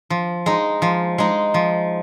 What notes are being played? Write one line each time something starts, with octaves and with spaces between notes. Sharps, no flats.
F3
G#3 D#4
F3
G#3 D#4
F3